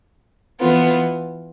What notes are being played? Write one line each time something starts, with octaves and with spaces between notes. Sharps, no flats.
E3 B3 F4